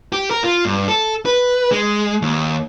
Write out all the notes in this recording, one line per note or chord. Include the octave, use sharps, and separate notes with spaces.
G4
A#4
F4
G2
A4
B4
G#3
D#2